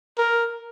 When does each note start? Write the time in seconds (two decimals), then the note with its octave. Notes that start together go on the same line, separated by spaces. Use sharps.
0.18 A#4